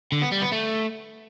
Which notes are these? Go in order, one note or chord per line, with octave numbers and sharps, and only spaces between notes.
D3
B3
G3
B3
A3